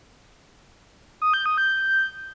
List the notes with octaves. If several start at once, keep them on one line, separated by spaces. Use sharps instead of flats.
D#6
G6
D#6
G6